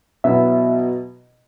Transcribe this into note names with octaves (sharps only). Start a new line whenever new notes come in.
B2 F#3 B3 E4 E5